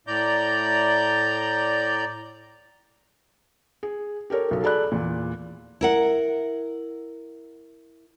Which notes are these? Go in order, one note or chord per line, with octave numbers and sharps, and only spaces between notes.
A2 D5 A#5 G6
G#4
G4 A4 A#4 C#5
B1 A4
G#4 A4 D5 B5 F#6
E2 A#2
E4 A#4 F#5